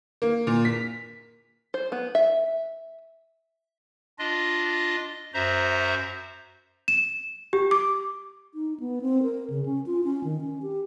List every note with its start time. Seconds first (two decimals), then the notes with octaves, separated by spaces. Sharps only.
0.22 A#3
0.47 A#2
0.65 B6
1.74 C5
1.92 B3
2.15 E5
4.19 D4 F4 D#5
5.34 F#2 F#4 C5 E5 A#5
6.88 E7
7.53 G4
7.71 D6
8.54 D#4
8.80 B3
9.02 C4
9.23 A#4
9.50 C#3
9.66 C#4
9.86 F4
10.04 C#4
10.24 D#3
10.41 C#4
10.62 G4